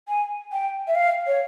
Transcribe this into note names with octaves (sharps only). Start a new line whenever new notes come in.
G#5
G5
E5
F5
C#5